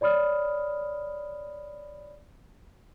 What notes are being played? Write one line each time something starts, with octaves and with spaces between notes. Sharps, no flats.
C#5 D5 B5 D#6 F6